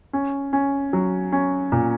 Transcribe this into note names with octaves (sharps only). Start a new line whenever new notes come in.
C#4
C#4
F#3
C#4
A#2